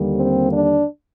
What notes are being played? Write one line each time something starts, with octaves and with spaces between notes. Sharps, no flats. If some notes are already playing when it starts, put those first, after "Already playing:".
Already playing: D#2 D3 G3 A#3
C4
D4